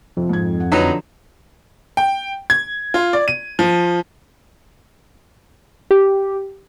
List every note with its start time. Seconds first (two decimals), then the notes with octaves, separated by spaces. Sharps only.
0.17 F2 C3
0.29 G#2 G#6
0.60 F#5
0.72 D3 F3 F#3 D#4 B4 E7
1.97 G5
2.50 G#6
2.94 F4
3.13 D5
3.28 D#7
3.59 F3
5.91 G4